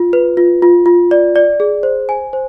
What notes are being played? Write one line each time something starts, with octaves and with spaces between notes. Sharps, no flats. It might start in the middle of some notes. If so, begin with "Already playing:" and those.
Already playing: F4
B4
F4
F4
F4
D5
D5
G#4
C5
G#5
C5